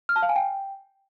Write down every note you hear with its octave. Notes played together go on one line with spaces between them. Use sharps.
F6
A5
F5
G#5
G5